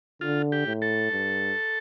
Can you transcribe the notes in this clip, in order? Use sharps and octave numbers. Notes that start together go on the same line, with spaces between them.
D3 F4
G4
A2
A4
G2